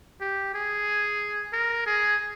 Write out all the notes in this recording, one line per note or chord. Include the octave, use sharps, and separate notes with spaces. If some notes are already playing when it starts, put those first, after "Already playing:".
G4
G#4
A#4
G#4